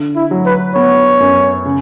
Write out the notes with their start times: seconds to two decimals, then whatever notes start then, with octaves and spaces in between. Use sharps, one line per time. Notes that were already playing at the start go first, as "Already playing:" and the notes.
Already playing: D3
0.16 E4
0.31 F#3
0.46 B4
0.75 B3 C#5
1.20 F#2
1.66 C#3